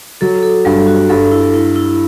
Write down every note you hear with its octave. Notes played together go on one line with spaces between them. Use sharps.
F#3 A4
A4
G2 G3
F#4
G2 A4
E4
E4
E4